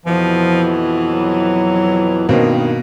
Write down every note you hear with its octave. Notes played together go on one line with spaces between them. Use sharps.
F2 B2 E3 F3
F#3
G2 B2 D#3 A#3 C4